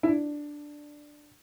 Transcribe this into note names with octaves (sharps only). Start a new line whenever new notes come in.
E4
D4